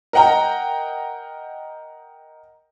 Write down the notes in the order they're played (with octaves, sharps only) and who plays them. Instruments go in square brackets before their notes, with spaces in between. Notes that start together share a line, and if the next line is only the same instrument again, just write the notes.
[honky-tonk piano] A#4 D#5 F#5 G5 A#5